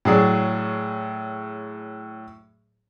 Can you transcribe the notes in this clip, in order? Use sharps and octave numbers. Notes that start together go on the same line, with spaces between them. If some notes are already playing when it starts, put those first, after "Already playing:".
A2 F#3 G#4 D5